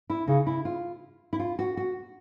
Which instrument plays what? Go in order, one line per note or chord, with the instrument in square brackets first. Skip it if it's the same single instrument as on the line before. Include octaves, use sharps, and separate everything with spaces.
[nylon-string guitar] E4
[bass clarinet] C#3 [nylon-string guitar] D#4
[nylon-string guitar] E4
F4
E4
F4
F#4
F#4